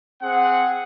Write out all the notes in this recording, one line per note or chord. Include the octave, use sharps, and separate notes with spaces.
C4 G#4 F#5